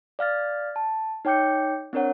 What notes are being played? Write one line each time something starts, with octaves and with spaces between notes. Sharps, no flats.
D5 F5 F6 A6
A5
D#4 C#5 G5 D6 G6 C#7
C4 D4 A#4 C#5 F#5